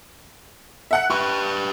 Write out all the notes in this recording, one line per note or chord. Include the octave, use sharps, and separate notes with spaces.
E5 F#5 F#6
G4 B4 C#6